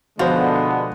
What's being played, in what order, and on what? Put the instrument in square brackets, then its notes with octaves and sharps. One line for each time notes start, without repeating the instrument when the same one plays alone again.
[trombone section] B2 D3 [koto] F3 [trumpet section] G#3 B3 [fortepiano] F#4 C5